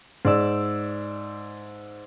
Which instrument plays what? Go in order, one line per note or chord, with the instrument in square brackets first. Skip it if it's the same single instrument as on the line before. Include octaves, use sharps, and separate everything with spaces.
[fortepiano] G#2 D5 E6